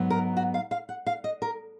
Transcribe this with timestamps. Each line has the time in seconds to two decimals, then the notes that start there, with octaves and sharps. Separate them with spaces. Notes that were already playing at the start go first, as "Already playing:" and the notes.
Already playing: G#2 F#3 B3
0.10 A#4
0.37 F#4
0.54 F5
0.71 F5
0.89 F#5
1.07 F5
1.24 D#5
1.42 A#4